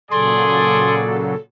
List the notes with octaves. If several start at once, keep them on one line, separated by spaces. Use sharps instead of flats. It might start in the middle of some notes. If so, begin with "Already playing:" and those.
A#2 C#3 F#3 G#4 A4 D5 C6